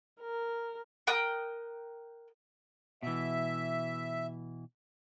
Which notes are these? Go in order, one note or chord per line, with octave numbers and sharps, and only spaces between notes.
A#4
A#4 G5 D#6 F#6
B2 E3 E5